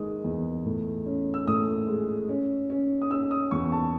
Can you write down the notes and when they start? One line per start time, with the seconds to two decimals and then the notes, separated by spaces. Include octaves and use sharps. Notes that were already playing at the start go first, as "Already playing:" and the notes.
Already playing: D#3 G#3 D#6
0.24 E2
0.66 A2
1.06 C#4
1.34 E6
1.47 A2 D#6
1.88 G#3
2.29 C#4
2.70 C#4
3.02 D#6
3.10 C#4 E6
3.31 D#6
3.51 E2 C#6
3.72 A5